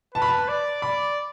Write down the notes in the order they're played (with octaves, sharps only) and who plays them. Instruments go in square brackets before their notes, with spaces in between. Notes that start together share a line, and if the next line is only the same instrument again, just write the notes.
[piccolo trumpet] B4 [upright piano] A5
[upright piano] B5
A5
[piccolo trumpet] D5
[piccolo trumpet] D5 [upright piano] B5